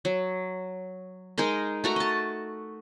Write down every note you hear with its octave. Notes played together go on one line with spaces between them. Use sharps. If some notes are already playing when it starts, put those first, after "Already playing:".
F#3
G#3 D#4 A#4 D#5
A3 F#4 A#5
D#5 A5